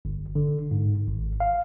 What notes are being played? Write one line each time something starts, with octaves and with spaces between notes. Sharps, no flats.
G1
D3
G#2
G#1
F5